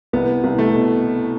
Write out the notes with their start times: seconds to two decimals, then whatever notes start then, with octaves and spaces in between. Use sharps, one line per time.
0.13 C2 B3
0.44 C2
0.58 A3
0.74 B2